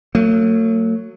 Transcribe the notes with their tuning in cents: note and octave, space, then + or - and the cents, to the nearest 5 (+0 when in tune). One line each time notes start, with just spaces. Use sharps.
F#3 +0 A3 +45